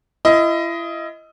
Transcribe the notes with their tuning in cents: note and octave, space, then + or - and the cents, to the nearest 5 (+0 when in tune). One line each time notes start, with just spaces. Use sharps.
E4 +35 D#5 +15